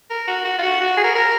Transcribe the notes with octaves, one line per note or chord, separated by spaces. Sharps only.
A#4
F#4
F#4
F4
F#4
F#4
G#4
A#4
A#4